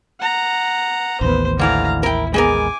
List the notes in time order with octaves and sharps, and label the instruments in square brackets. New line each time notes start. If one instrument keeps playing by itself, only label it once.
[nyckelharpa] F#5 A#5
[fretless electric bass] A1 D#2 [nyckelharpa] B3 C5
[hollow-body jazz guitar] D3 E3 A3 [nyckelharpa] F5 A#5
[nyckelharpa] E4 [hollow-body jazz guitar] A#4 G5
[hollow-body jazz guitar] G#3 B3 A#4 [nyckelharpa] G#5 D6